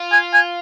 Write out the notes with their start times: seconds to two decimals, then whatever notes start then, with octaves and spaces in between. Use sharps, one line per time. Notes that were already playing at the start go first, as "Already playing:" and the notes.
Already playing: F4
0.12 G#5
0.33 G#5